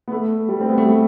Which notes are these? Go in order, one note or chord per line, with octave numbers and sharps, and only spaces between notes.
B3
A3
G3
C4
B3
A3
G3